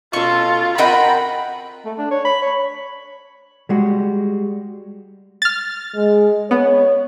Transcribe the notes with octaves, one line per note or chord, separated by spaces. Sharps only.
B2 C#4 F4 A4 C#6
C4 F#4 A#4 D#5 F#5 G5 B5
A3
D4
C#5
B5
C#5
G3 G#3 F#4
F6 A6
G#3
B3 C#5